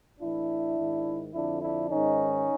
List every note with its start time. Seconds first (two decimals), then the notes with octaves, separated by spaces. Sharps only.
0.21 A2 E3 D4 E4
0.77 G#2 D#3
1.33 F2 D3 F3 D4 E4
1.62 D4 E4
1.90 G#2 D#3 C#4 D#4